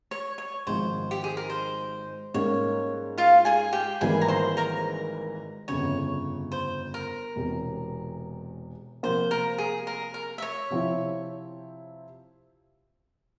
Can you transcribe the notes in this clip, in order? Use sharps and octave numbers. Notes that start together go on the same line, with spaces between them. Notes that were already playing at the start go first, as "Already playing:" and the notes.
C#5
C#5
G#1 G#2 F3 C5
G4
G#4
A#4
C5
G#2 G3 A#3 C#4 C#5
F4 F5
G#4 G#5
G4 G5
G#1 G#2 E3 G3 A#3 G#4 G#5
A#5
C5 C6
A#4 A#5
G1 F2 C#3 C#5
C5
A#4
E1 E2 C3
C3 F3 A#3 C5
A#4
G#4
A#4
A#4
E5
C#5
C3 F3 C4 E4